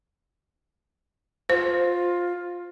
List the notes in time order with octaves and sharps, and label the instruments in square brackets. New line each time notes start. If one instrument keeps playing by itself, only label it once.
[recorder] F4 [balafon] C5